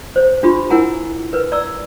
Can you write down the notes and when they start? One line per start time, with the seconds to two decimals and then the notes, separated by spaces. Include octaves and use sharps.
0.16 C5 C#5
0.43 D4 F4 G4 B5 C6
0.70 E4 A#4 F#5 G#5 A#5
1.33 A#4 B4
1.52 D5 A#5 E6